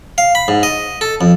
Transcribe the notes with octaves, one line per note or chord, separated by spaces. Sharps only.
F5
B5
G#2
D#5
A4
F2